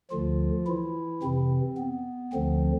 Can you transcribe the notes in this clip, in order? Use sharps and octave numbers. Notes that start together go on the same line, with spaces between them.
D2 D3 F3 F4
E3 E4
F2 C3 E3 C4
B3
D2 D3 F3 C4